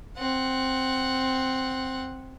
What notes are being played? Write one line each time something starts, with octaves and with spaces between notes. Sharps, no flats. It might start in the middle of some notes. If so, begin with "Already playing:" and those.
C4 F#5